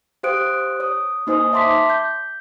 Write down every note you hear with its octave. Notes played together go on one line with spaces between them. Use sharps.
G4 C5 F5 D#6 F#6 D7
C#5 D#6
A#3 D#4 C5 G#5 D#6
C#5 E5 A5 C6 D6 B6
G6